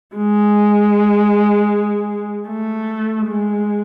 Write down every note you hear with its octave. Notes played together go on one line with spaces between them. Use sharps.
G#3
A3
G#3